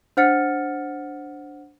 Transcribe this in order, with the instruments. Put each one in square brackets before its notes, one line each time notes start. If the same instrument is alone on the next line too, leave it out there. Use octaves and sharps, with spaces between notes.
[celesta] D4 C5 F#5 F6 A6 C#7